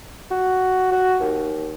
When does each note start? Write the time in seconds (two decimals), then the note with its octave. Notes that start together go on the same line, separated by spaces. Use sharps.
0.31 F#4
0.91 F#4
1.20 D#2